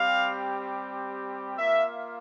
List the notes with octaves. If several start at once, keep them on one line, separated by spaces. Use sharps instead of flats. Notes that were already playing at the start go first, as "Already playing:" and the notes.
Already playing: G3 C4 G4 F5
A#3 F4 E5